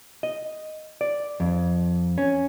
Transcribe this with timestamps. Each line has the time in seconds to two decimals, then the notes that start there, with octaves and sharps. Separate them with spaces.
0.23 D#5
1.01 D5
1.40 F2
2.18 C#4